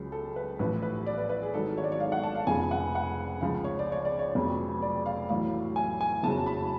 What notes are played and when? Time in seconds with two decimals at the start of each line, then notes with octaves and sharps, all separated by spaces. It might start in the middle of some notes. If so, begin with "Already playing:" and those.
Already playing: C#2 C#3 F#3
0.12 A4
0.36 B4
0.59 A1 A2 F3 B4
0.82 B4
1.06 D5
1.18 B4
1.29 B4
1.42 G#4
1.53 G#1 G#2 F#3 A4
1.78 C#5
1.84 D5
1.92 C#5
2.00 F5
2.12 F#5
2.23 A5
2.35 F5
2.47 F1 F2 C#3 F3 G#5
2.71 F#5
2.95 F#5
3.41 C#2 C#3 F3 F5
3.64 C#5
3.79 D5
3.92 C#5
4.05 D5
4.19 C#5
4.35 F1 F2 C#3 F#3
4.82 D5
5.06 F5
5.29 A1 A2 F#3 F5
5.76 G#5
6.01 G#5
6.23 F#1 F2 C#3 F#3 A5
6.46 B5